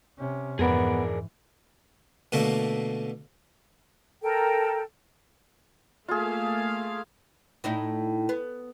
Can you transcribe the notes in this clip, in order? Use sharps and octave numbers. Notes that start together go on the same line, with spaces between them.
C3 C#4
F2 G#2 E3 B3 G#4 A#4 D5
B2 D3 A3 A#3
A4 A#4 G5
A3 A#3 F4 G#4 F5
A2 D#4 E4
B3